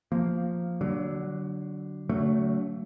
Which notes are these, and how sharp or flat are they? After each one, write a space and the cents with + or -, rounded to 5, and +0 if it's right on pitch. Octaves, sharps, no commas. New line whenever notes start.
F3 +0 A#3 -10
D3 +0 F#3 +25
D3 -45 F#3 +10 A3 +10